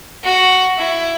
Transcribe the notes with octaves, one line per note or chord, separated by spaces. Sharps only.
F#4
E4